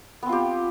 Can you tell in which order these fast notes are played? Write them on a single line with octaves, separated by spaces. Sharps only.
B3 C4 F4 G4